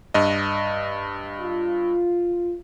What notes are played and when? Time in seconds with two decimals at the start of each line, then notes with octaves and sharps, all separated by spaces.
0.14 G2 D#5
1.40 F4